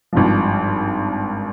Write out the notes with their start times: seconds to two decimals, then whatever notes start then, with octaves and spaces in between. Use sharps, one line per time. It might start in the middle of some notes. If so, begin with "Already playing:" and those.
0.13 G#1 G2 F3